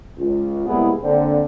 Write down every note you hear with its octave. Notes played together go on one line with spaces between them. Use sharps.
C#2
C2 G#3 A#3 B3 E4 G#4
D3 A#3 C4